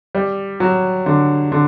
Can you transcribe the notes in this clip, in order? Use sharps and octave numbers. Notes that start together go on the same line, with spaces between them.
G3
F#3
D3
D3